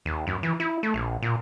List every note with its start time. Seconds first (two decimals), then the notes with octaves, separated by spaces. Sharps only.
0.05 D#2
0.27 F#2
0.43 E3
0.60 E4
0.83 A3
0.94 A#1
1.22 A#2